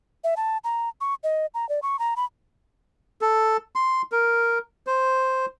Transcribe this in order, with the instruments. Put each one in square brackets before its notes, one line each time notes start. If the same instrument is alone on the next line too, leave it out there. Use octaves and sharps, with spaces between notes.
[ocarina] E5
A5
A#5
C#6
D#5
A#5
D5
C#6
A#5
B5
[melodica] A4
C6
A#4
C5